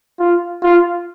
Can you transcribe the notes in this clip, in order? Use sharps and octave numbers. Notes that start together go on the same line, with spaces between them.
F4
F4